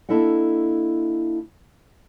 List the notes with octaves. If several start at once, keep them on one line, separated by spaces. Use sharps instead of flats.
A#3 D4 E4 A4 D#5 F#5